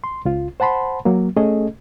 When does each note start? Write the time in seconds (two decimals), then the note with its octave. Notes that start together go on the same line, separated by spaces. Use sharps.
0.04 C6
0.25 C#2 F4
0.60 C5 F#5 A5 B5 C6
1.05 F#3 A#3
1.36 A3 C#4 G#4 A4 D#5